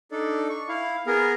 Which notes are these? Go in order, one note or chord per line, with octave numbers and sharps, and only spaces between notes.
D4 D#4 A4 D5
C#6
E4 F5
B3 G#4 A#4